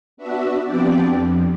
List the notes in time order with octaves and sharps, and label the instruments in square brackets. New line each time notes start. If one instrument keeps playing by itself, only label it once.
[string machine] B3 D4 F#4 E5
F3 B3 C4 D4 G4 D5
F2